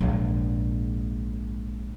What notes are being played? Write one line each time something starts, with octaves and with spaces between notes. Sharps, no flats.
A#1 G#2